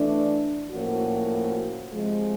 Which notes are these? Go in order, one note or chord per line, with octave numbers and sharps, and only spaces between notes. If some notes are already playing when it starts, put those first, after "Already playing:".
Already playing: E3 A3 D4
A2 F3 A#3 C#4 F#4
C3 F3 G#3